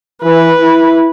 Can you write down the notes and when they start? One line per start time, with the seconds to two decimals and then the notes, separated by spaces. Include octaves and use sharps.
0.23 E3 B4
0.62 E4